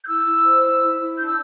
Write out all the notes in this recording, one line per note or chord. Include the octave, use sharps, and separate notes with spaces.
G6
E4 E6
E4
C5
E4
E4
E4
D4 G6
E6